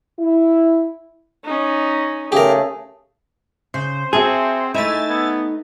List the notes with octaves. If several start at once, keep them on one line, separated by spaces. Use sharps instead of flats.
E4
C#4 D#4
C#3 A3 G4 G#4 A#4
C#3 C5
C4 F#4 G#4 E5 A5
A3 D#4 E4 E5 G#5 A6
B3